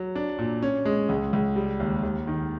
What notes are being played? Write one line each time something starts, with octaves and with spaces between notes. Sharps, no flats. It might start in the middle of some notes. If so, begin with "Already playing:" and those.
Already playing: F#3
D4
A#2
C#4
G#3
C#2
C#2
G3
D#2
D#2
D#3